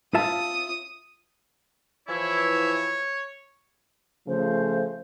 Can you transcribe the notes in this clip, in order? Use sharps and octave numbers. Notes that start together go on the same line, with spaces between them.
F4 E5 A5 D#6
E3 F3 E4 C#5
C#3 F3 A3 C5